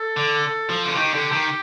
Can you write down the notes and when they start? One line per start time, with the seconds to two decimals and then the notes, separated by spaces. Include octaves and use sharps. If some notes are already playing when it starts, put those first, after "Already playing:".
Already playing: A4
0.16 D3
0.69 F3
0.85 D3
0.96 D#3 G4
1.14 D3
1.32 D#3